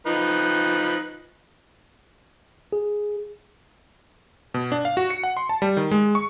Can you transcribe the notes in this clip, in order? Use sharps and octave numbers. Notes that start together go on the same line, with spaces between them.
F3 D#4 B4
G#4
B2
D4
F5
F#4
C#7
F#5
C6
A5
G3
D#3
G#3
C#6